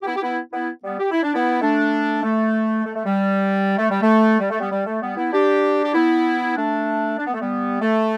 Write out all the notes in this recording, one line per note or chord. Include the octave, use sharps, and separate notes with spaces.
G4
B3 E4
G4
B3 E4
B3 E4
G3 B3
G4
E4
D4
B3 E4
A3 D4
A3
A3
A3
G3
A3
G3
A3
G3
A3
G3 B3
G3
A3
G3 B3
B3 E4
D4 G4
G4
B3 E4
A3 D4
D4
B3
A3
G3 B3
A3